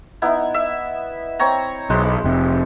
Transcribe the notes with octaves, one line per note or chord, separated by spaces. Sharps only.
B3 D#4 E4
E5
C4 C#5 A#5
B1 G#3 B4 C5
F1 C3